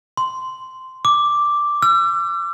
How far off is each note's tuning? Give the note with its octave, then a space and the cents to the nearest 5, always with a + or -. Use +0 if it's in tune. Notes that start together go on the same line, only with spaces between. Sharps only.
C6 -10
D6 +0
E6 +45